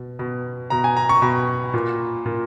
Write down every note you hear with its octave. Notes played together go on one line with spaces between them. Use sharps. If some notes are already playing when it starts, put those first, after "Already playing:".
Already playing: B2
B2
B2 A#5
G#5
A#5
C#6
B2 B5
A#2
A#2